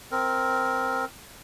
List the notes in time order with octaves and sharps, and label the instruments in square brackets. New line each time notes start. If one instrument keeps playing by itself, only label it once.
[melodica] C4 A#4